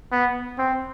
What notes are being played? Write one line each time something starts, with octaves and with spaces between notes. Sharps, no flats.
B3
C4